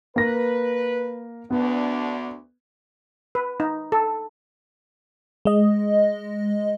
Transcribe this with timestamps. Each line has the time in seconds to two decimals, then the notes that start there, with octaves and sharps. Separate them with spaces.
0.16 A#3 B4 A#6
1.51 D2 B3 D4
3.35 B4
3.60 D#4
3.92 A4
5.45 G#3 D#5